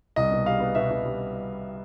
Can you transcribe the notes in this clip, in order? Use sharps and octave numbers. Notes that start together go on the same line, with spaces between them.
C2 D#5
B2
G3 F5
B3
B2 E5
B2
G3